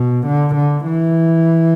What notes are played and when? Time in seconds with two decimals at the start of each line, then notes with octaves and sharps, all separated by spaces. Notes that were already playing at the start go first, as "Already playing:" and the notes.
Already playing: B2
0.27 D3
0.55 D3
0.85 E3